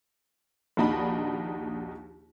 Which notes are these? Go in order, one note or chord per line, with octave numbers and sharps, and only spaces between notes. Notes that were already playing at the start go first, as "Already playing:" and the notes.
A#1 D#2 D4 D#4 F#4 B5